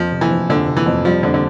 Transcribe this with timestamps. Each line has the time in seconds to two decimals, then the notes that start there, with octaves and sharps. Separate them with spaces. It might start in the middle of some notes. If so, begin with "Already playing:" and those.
Already playing: F2 F3
0.12 C3
0.21 E3
0.31 F3
0.49 F2 D3
0.68 C3
0.77 E3
0.86 F2
1.05 F3 G3
1.23 F2 D3
1.34 D3